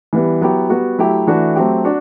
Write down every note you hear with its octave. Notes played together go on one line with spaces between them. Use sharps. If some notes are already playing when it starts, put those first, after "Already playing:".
E3 G3 B3
F#3 B3 E4 G4
G3 B3 F#4
F#3 A3 E4 G4
E3 A3 D4 F#4
F#3 A3 C4 G4
D4 F#4